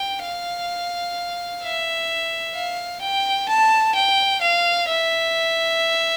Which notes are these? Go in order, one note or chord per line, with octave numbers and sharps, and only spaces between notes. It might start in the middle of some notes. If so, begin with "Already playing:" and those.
Already playing: G5
F5
E5
F5
G5
A5
G5
F5
E5